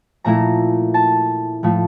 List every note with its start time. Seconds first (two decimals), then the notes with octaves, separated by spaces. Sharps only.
0.24 A#2 F3 A3 E4 A#5
0.94 A5
1.63 A2 F3 A3